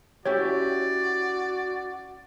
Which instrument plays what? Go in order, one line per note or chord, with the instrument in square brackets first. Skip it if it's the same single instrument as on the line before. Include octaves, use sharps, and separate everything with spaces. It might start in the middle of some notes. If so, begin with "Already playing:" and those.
[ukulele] C#4 E4 G4 [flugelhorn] F#4 [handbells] C#5 [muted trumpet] D5